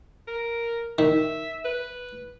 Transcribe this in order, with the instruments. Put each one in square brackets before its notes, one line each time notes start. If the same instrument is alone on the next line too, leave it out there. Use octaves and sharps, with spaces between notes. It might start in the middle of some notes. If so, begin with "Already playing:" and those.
[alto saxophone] A#4
[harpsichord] D#3 [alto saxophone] E5
[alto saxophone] B4